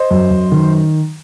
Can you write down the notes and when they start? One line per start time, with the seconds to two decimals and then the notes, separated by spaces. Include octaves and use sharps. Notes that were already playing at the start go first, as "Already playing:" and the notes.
Already playing: C5 D#5
0.11 F#2
0.31 F#2
0.52 D#3